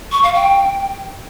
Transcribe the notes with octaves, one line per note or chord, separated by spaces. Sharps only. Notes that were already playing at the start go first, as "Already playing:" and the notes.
C#6
F5
G5